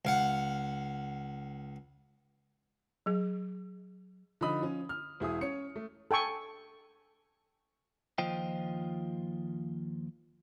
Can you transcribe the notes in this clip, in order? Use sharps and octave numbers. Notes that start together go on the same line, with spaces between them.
C#2 F5 F#5
F#3 G#4
D3 F3 D#4 D#5 B5 D#6
F3 C#4
F6
E1 E4 G#4 D#6
C#4 C#5 C#7
A3
A4 G5 G#5 C#6
D#2 F3 F4 C5 D#5 G5